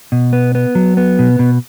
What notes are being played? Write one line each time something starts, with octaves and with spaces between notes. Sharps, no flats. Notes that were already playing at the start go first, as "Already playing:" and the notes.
B2
B3
B3
F#3
B3
B2
B2